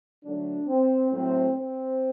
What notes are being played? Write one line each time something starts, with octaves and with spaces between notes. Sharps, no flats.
D3 F#3 A3 D4
C4
A2 F#3 A3 C4
C4